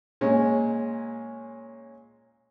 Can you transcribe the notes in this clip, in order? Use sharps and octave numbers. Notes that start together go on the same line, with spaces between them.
A#2 G#3 C#4